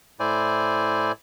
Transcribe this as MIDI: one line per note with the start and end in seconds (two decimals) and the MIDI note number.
0.20 1.12 45
0.20 1.12 64
0.20 1.12 72
0.20 1.12 74
0.20 1.12 80